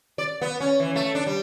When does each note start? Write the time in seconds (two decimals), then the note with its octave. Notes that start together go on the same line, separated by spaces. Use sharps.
0.18 D5
0.41 B3
0.60 C#4
0.80 E3
0.96 A3
1.15 D4
1.26 G3